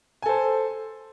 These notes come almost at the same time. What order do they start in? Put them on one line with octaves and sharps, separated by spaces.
G#5 A4 C5